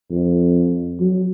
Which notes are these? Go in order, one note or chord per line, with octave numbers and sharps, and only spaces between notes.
F2
F#3